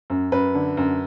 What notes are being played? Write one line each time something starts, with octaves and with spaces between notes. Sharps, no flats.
F#2
F#2 B4
D3
F#2